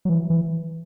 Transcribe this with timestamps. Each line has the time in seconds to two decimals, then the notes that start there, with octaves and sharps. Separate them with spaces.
0.05 F#3
0.09 E3
0.30 E3